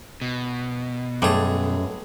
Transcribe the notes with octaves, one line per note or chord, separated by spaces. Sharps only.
B2
B1 F#2 G3 A3 G#4